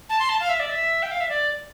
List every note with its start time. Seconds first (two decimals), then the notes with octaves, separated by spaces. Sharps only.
0.09 A5
0.20 C6
0.29 A5
0.40 F5
0.49 E5
0.60 D5
0.70 E5
1.03 G5
1.11 F5
1.20 E5
1.29 D5